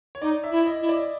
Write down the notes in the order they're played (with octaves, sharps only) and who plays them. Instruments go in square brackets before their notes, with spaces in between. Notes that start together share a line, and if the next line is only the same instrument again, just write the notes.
[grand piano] C#5
[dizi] D#4 [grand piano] D5
[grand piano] E5
[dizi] E4
[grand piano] D#5
[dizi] E4
[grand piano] D5